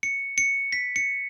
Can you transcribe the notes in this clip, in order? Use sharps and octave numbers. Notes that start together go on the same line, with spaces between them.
C#7
C#7
B6
C#7